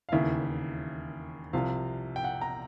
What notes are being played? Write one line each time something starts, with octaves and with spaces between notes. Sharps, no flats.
F5
E1 D#2 C#3 E3 E5
C2 C3 F3 F5
G5
F#5
A#5